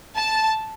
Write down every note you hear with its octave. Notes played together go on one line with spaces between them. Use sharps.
A5